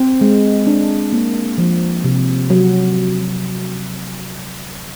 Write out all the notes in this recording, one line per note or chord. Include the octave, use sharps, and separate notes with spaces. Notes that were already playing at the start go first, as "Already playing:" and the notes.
Already playing: C4
G#3
D4
A#3
F3
C3
F#3